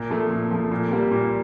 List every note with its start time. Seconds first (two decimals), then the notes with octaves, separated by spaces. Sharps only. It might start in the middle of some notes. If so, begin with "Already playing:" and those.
Already playing: A#2
0.10 F3 A3
0.31 A#2
0.51 F3 A3
0.71 A#2
0.91 G3 A#3
1.11 A#2